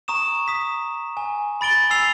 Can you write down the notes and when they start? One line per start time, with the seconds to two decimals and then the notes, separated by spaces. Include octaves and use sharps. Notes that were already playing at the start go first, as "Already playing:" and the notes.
0.08 A#5 C#6 D#6 E7
0.47 D#6 B6 E7
1.17 G#5
1.61 B5 A6 D7 G7
1.90 G#5 B5 E6 C7 F7